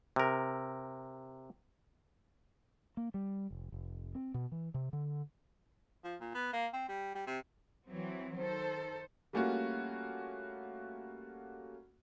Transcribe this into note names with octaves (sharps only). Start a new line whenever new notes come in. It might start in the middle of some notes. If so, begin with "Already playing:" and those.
C3 A#4
A#3
G3
F1
F1
C4
B2
E3
C3
D3
F3
A#2
B3
A#3
C4
G3
G3
C3
E3 F#3 C4
D#3 A4 C5
G3 A3 A#3 C#4 F4 F#4